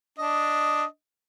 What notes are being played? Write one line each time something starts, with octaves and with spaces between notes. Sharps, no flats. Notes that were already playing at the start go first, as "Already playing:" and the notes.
D4 D#5